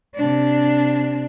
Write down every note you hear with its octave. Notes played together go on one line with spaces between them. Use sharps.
C3 D4